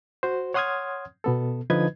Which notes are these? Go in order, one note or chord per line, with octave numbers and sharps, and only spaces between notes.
F#4 C5
C#5 F#5 C6 D#6 F6 G#6
B2 B3 A4
D3 F3 D#4 B4 D#5 G#6